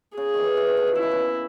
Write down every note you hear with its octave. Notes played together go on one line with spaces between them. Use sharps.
C#3 G#4
D#3 E3
E3
D#3
B2
D#3
C#3 E4
B2
C#3